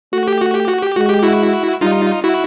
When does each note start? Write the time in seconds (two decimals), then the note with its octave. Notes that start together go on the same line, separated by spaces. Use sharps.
0.13 A3 F#4
0.28 G4
0.41 F#4
0.55 G4
0.68 F#4
0.82 G4
0.96 G#3 F#4
1.09 G4
1.23 E4 F#4
1.81 G3 D#4 F4
2.24 E4 F#4